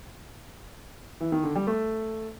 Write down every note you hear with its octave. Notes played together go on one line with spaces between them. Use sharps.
E3
D#3
D3
G3
A3